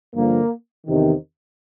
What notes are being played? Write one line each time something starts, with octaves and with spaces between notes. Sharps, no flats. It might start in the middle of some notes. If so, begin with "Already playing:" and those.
G2 D3 F3 A#3
E2 C3 D#3